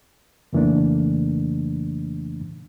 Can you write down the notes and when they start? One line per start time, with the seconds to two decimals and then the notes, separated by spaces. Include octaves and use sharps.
0.53 F2 C#3 E3 A3 A#3 D4